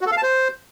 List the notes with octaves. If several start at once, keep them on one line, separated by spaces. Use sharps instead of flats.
F#4
A4
F5
A5
C5